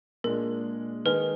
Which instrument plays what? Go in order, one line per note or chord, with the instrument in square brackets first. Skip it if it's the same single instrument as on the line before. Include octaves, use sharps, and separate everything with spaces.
[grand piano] A#2 G#3 D4 [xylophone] A#4
[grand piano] D#3 G#3 D#4 G#4 [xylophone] B4